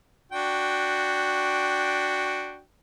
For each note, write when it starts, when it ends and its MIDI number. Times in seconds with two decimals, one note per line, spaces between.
0.32 2.60 62
0.32 2.60 66
0.32 2.60 79